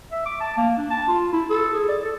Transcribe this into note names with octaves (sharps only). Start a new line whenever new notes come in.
E5
D6
A5
A#3
D4
A5
F4
E4
A4
G#4
D5
A4